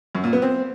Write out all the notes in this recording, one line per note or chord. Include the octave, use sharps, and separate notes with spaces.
F#2
A#2
B3
C4